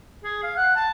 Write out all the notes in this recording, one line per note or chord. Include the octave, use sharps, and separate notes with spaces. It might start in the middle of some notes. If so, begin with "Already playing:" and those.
G#4
F5
F#5
A5